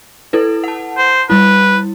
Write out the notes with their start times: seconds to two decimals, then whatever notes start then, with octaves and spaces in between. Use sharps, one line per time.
0.33 E4 A4 B4
0.64 F#5 A5
0.97 C5
1.30 G3 E4 B4